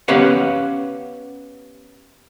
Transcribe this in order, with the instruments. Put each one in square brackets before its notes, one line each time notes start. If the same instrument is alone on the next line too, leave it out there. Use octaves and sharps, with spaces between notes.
[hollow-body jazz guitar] B3 C#4 G4 B4 F5 F#5